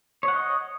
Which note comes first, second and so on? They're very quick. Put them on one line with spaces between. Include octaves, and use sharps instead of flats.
C#5 F#5 D#5